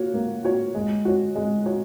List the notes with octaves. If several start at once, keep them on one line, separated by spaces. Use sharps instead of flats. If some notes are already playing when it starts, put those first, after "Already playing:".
Already playing: A#3 F#4 C#5
A#3
F#4 C#5
G#3
F#4 C#5
G#3
F#4 C#5